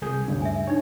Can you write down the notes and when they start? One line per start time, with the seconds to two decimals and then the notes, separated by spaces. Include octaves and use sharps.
0.02 C2 G#4 G6
0.28 D2 G2 C#3
0.42 E5 G#5
0.67 D4 D#4 C#5